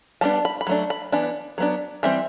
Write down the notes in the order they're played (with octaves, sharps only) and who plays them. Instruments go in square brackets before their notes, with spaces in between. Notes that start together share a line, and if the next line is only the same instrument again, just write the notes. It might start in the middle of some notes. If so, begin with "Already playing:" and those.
[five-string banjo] G3 B3 D4 A5
B5
B5
F#3 A3 D4
B5
E3 B3 D4
F#3 B3 D4
E3 G3 C4 E5